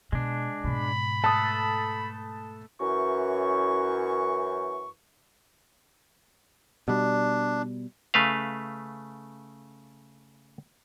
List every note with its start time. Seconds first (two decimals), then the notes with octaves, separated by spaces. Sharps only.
0.12 B2 G#3 D4
0.64 G#2 B2 B5
1.24 A3 A4 B4 A5 D#6
2.80 F#2 E3 C#6
6.88 B2 G3 D4
8.14 C#3 A3 B4 F5